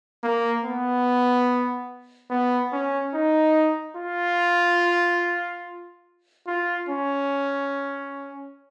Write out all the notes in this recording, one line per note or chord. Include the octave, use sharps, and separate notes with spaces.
A#3
B3
B3
C#4
D#4
F4
F4
C#4